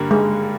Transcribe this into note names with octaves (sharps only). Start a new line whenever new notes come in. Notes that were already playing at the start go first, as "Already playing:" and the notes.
Already playing: G2 D3 G3 A#3
G#3